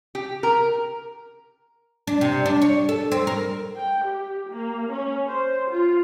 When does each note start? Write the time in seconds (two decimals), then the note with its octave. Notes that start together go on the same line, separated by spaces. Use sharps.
0.15 G4
0.43 A#4
2.07 D4
2.21 C3
2.46 D4
2.62 C#5
2.89 A4
3.12 C4
3.27 A#4
3.77 G5
4.08 G4
4.50 A#3
4.92 C#4
5.26 C5
5.71 F4